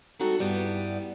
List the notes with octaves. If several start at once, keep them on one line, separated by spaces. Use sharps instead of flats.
G3 C4 D#4 F#4 A4
G2 G3 B3 E4